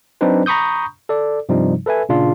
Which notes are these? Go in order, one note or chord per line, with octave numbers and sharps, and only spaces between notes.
F#3 C4 D4 D#4 B4 C5
A#5 B5 C#6 D#6 G6
A4 D5
G2 C3 F3 G3 D#4
A4 B4 E5 G#5
A#2 C#3 D4 F4